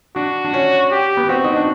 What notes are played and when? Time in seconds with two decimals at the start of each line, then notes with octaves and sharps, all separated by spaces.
0.16 D4 F#4
0.45 D4
0.54 C#4
0.92 G4
1.17 B3
1.29 C4 F#4
1.44 D#4
1.56 D4